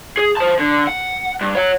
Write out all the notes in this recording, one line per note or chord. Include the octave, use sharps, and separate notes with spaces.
G#4
C5 A5
D3
F#5
G2
C#5 F#5